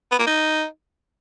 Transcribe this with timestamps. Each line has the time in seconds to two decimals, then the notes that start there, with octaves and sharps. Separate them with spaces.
0.12 B3
0.19 A#3
0.27 D#4